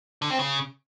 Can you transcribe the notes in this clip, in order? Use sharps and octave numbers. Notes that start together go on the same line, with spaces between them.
D3
C4
C#3